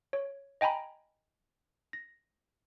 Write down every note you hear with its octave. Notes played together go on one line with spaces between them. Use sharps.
C#5
D#5 G5 G#5 A#5 B5
A#6